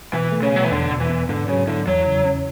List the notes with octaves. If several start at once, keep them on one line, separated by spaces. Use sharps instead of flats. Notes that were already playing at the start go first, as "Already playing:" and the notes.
B2 E3
A3
C#3
B2 F#3
E3
E2 D3
B2
E3
B3
G#2 D3
C#3 F#3
D3 E4
E2 F#3
C#3
C#4